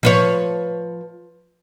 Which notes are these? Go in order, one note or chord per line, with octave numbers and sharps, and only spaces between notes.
F3 B4 C#5